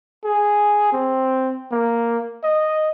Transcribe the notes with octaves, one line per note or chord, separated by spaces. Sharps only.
G#4
C4
A#3
D#5